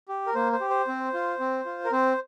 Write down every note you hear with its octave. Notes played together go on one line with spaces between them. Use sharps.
G4
A#4
A#3 C5
C5
G4
C5
C4
F4
C4
F4
A#4
C4 C5